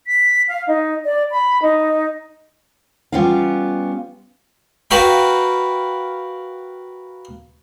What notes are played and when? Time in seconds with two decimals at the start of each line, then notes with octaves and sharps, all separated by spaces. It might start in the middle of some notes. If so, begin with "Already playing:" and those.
0.07 B6
0.48 F5
0.68 D#4
1.05 D5
1.31 B5
1.62 D#4
3.12 G3 B3 C#4 F4 F5
4.91 F#4 A#4 B4 F5 G5 B5